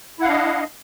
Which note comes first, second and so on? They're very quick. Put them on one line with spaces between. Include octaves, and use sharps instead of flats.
E4 F#5 F5 D4 D#5